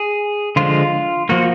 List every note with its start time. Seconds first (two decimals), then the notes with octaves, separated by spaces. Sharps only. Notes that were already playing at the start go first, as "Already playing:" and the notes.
Already playing: G#4
0.56 D3 F3 G#3 F4
1.29 F3 A#3 F#4